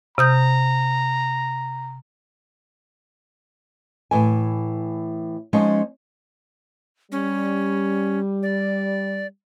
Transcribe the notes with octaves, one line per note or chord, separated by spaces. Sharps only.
C3 A#5 D#6 G6
A2 E3 G#5
F3 G#3 C#4 D#4
G3 C#4
D5